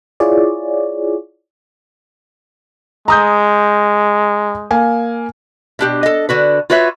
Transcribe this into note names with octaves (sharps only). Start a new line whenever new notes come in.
E4 F4 G#4 C#5 D5
G#3 A#5 D#6 G6
A#3 G#5
B2 D4 G4
A4 D#5
D3 F#4 B4
F4 F#4 B4 C#5 E5